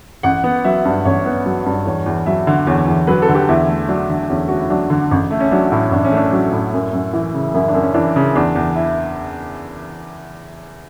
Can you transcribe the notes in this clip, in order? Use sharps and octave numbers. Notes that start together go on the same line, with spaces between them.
A1 F#5
B3
F#3 E5
G2
A1 C#5
B3
F#3
G2
E2 C#5
E2
F#3 E5
D3
E2 C#5
E2
F#3 B4
A4
D3
G4
E2 E4
A3
F#3 D4
D3
E2 C#4
A3 F#4
E4
F#3 D4
D3
A1
A3
C#4
F#3 D4
A2
A1 D4
C#4
A3
D4
F#3 D4
A2
F#2
F#2
E3 E4
C#3
F#2 E4
D4
F#2
C#4
E3 D4
C#3
E2 D4
E2
E4